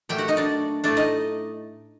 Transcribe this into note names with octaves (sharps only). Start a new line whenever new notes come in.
A#2 F#3 A3 G4 G5
F#4 F#5
D#4 D#5
D4 D5
A2 A3 D4 D5
D#4 D#5